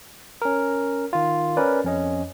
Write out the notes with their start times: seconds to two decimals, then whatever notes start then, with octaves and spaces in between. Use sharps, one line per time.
0.42 C#4 A#4
1.13 D#3 F4
1.57 C#4 A#4 B4 D5
1.84 F2 C#4 D#5